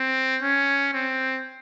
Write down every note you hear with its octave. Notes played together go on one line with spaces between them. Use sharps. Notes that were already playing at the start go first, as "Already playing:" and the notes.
Already playing: C4
C#4
C4